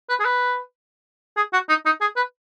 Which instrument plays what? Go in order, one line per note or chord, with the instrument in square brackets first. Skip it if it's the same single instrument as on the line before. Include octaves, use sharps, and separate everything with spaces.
[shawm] B4
G#4
B4
G#4
F#4
D#4
D#4
G#4
B4